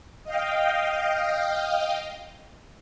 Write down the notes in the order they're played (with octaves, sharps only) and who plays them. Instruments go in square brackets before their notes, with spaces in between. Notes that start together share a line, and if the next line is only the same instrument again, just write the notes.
[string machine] D#5 F5 G5